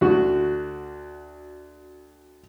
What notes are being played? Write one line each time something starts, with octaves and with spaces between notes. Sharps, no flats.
D2 F#4